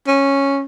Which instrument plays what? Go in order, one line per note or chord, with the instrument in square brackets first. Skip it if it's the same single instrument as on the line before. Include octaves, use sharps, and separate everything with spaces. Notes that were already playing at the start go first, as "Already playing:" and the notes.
[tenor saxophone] C#4